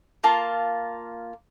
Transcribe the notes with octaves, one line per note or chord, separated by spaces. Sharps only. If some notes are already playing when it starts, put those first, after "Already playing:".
A#3 F4 A5